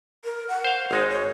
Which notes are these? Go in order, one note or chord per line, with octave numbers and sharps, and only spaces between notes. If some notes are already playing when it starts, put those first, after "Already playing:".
A#4
F#5
C5 F5
G#1 G#3 D#4 C5
C#5